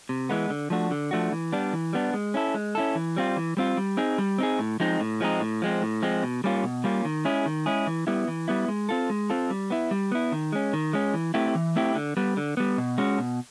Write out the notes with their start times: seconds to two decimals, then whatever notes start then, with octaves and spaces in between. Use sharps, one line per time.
0.09 C3
0.29 E3 G#3 B3
0.50 D3
0.70 F3 A3 D4 F#4
0.91 D3
1.11 F3 A3 D4 F#4
1.32 E3
1.52 G3 B3 D4
1.73 E3
1.93 G3 B3 D4
2.14 G#3
2.34 C#4 E4 A4
2.54 G#3
2.75 C#4 E4 A4
2.95 E3
3.17 G3 C4 F4
3.37 E3
3.57 G3 C4 F4
3.77 G3
3.97 C4 D#4 G#4
4.18 G3
4.39 C4 D#4 G#4
4.59 A2
4.80 F3 G#3 C4 D#4
5.00 A2
5.20 F3 G#3 C4 D#4
5.40 A2
5.62 F3 G#3 C4
5.82 A2
6.02 F3 G#3 C4
6.23 B2
6.44 G3 A#3 C#4 F4
6.63 B2
6.84 G3 A#3 C#4 F4
7.05 D#3
7.25 G#3 C#4 E4 G#4
7.46 D#3
7.66 G#3 C#4 E4 G#4
7.87 E3
8.07 G3 B3 E4
8.28 E3
8.48 G3 B3 E4
8.68 G#3
8.89 C4 F4 A4
9.10 G#3
9.30 C4 F4 A4
9.50 G3
9.70 B3 E4
9.91 G3
10.12 B3 E4
10.32 D#3
10.52 G#3 C#4
10.73 D#3
10.93 G#3 C#4
11.14 E3
11.34 A3 C4 E4 G4
11.55 E3
11.76 A3 C4 E4 G4
11.95 D3
12.17 G3 B3
12.37 D3
12.57 G3 B3
12.78 B2
12.98 G#3 C#4 F#4
13.18 B2